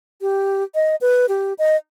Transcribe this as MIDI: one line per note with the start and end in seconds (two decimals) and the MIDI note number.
0.21 0.63 67
0.75 0.96 75
1.01 1.26 71
1.29 1.53 67
1.59 1.76 75